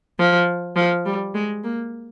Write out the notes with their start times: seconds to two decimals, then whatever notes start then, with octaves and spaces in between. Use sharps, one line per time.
0.19 F3
0.76 F3
1.06 G3
1.35 G#3
1.64 A#3